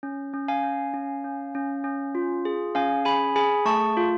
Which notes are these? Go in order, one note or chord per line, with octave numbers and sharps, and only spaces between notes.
C#4
C#4
F5 G#5
C#4
C#4
C#4
C#4
C#4
F4
G#4
C#4 F5 G#5
G#4 G#5 B5
G#4 G#5 B5
A3 A5 C#6
F4